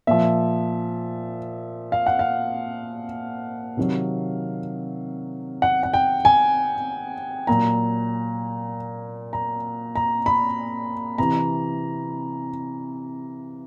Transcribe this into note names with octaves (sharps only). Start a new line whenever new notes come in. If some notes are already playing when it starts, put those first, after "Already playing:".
A#2 F3 E5
F5
F#5
F5
C3 D#3 F#3
F#5
F#5
G5
G#5
A#2 F#3 A#5
A#5
A#5
B5
C3 E3 A#5